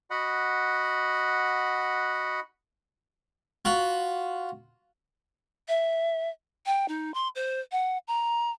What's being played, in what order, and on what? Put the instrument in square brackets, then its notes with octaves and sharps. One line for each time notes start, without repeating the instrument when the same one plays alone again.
[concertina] F#4 D#5 F#5 B5
[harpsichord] F4 F#4 B5
[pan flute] E5
G5
D#4
C6
C5
F#5
A#5